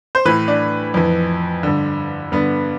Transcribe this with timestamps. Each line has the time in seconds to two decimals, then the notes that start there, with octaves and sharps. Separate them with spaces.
0.15 C5
0.25 A2 E3 B4
0.48 D4
0.94 F2 E3
1.63 G2 D3
2.32 G2 D3 B3